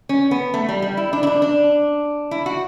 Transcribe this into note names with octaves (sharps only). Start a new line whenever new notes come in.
C#4
B3
A3
G3
G3
E4
D4
E4
D4
D4
E4
F#4